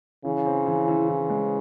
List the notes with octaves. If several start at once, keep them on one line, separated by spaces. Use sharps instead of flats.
C#3 E3
C4
E3
E3
E3
G#3